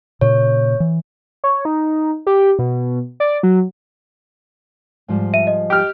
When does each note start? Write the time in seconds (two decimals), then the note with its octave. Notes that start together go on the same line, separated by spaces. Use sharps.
0.21 A#2 C#3 C#5
0.80 E3
1.44 C#5
1.65 D#4
2.27 G4
2.59 B2
3.20 D5
3.43 F#3
5.08 G#2 F3 G3
5.34 E5 D#7
5.47 D#5
5.70 G4 F6